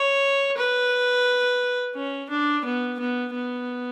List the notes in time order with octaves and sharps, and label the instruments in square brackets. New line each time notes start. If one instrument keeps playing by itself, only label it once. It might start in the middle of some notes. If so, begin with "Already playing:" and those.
Already playing: [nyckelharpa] C#5
B4
C#4
D4
B3
B3
B3